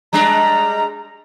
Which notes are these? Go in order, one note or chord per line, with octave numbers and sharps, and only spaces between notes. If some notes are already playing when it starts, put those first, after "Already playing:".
G3 G#3 D4 A#5